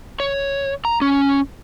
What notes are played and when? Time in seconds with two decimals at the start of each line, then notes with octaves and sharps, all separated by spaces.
0.20 C#5
0.85 A#5
1.01 C#4